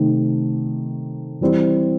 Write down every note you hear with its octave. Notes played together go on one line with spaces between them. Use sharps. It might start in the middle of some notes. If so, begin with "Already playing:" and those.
Already playing: C3 D#3 A3 C4 D#4
E3 G3 C4 E4